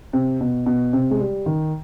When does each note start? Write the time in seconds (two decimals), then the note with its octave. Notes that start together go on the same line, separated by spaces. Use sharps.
0.13 C3
0.41 B2
0.66 B2
0.93 C3
1.11 G#3
1.20 G3
1.46 D#3